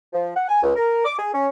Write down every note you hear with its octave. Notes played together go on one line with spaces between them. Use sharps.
F3
F#5
G#5
C#2
A#4
D6
G#4
C#4